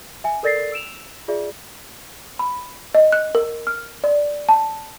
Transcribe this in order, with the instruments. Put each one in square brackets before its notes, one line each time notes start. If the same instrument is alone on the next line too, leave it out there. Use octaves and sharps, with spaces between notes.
[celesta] E5 G#5
A4 A#4 D5 A6 A#6 C7
E6 D7 E7 F7
F4 G#4 D5 E5
[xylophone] B5
D#5
F#6
A#4
F6
D5
A5